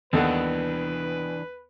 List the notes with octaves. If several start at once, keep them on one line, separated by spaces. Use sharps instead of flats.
D#2 E3 B3 D4 A4 B4 F#5